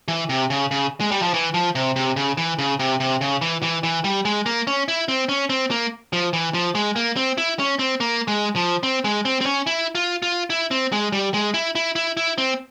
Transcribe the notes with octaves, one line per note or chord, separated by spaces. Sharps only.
E3
C3
C#3
C#3
G#3
G3
F3
E3
F3
C3
C3
C#3
E3
C#3
C3
C3
C#3
E3
E3
E3
G3
G#3
A#3
C#4
E4
C4
C#4
C4
A#3
F3
E3
F3
G#3
A#3
C4
E4
C#4
C4
A#3
G#3
F3
C4
G#3
C4
C4
C#4
E4
F4
F4
E4
C4
G#3
G3
G#3
E4
E4
E4
E4
C4